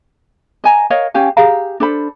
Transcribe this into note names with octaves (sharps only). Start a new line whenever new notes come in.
D#5 G#5 A#5
A#4 C#5 D#5 F5
C#4 G4 F5 G#5
G4 G#4 F5 A#5
D4 A4 C5 B5